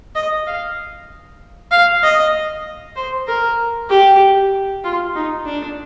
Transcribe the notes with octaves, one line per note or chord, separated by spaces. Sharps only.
D#5
F5
F5
D#5
C5
A#4
G4
F4
D#4
D4